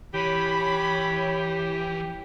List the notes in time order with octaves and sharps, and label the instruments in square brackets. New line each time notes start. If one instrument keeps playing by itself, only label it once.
[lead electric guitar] E3 [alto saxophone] G4 [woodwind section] C#5 [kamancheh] B5